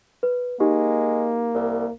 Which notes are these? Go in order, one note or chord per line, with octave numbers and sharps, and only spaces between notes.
B4
G#3 A#3 D#4 G4
C2